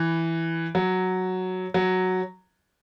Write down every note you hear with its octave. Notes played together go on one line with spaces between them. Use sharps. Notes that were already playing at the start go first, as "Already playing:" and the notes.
Already playing: E3
F#3
F#3